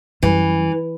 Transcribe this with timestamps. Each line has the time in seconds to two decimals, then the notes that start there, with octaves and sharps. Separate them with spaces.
0.22 F#2 E3 G3